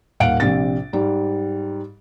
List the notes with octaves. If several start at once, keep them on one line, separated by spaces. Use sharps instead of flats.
D#1 F5 F#5 D7
A#1 C3 A6
G#2 G3